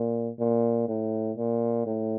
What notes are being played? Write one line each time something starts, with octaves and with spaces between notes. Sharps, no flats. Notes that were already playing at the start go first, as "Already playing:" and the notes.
Already playing: A#2
A#2
A2
A#2
A2